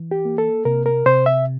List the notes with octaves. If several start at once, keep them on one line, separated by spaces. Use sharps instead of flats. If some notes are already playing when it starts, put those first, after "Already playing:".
Already playing: E3
G4
A#3
A4
C3 A#4
A#4
C3 C5
E5